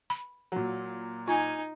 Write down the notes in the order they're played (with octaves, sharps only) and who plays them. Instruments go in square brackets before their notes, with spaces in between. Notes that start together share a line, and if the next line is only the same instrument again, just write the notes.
[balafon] B5
[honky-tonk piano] A#2 F#3
[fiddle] D#4 [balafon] F4 [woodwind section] G#5